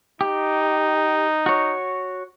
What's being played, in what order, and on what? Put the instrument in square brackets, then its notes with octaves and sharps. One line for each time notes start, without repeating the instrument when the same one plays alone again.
[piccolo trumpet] D#4 [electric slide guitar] G4
[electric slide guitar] F#4 C#5